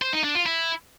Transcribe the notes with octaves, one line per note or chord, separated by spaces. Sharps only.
C5
D#4
D4
F4
E4